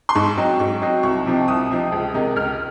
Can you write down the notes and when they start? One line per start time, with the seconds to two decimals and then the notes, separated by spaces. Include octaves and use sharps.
0.09 C6
0.15 G#2 C#6
0.37 F#3 C4 D#4
0.59 G#2 C#6
0.82 F#3 C4 D#4
1.03 C2 C#6
1.26 C3 F3 C4 D#4
1.48 C2 D#6
1.70 C3 F3 C4 D#4
1.92 C#2
2.14 C3 D#3 G#3 D#4
2.36 C#2 F6